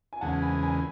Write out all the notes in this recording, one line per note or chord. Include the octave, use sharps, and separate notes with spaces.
G#5
E2 C#3 G#3 F#5 A5
G#5 B5
G#5 B5